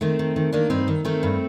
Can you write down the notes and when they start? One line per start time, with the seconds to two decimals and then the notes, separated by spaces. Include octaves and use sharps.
0.01 D#3 A3 C4
0.19 D#3
0.36 D#3
0.52 D#3 A#3 D4
0.70 G2 C4 D#4
0.88 D#3
1.05 D#3 A3 C4
1.23 G2